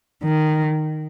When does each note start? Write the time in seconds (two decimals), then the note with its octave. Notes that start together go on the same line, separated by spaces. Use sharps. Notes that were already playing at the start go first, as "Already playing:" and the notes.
0.23 D#3